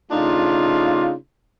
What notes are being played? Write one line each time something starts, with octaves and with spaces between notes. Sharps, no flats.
C#3 A3 D4 D#4 F4